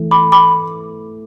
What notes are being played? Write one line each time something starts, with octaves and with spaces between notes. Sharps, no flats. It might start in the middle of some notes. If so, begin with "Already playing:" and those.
Already playing: E3 A3
B5 D6
B5 D6